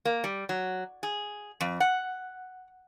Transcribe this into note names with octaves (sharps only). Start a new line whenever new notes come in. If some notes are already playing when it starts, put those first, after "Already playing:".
A#3
G3
F#3
G#4
F2
F#5